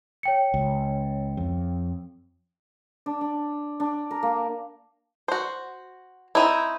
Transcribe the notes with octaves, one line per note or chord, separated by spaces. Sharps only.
C#5 G5 C#7
C#2
F2
D4
D4
D4
A#4
A#3
F#4 C5
C4 D#4 E4